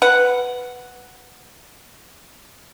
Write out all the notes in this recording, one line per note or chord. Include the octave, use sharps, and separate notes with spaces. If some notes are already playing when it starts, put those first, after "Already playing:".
B4 F#5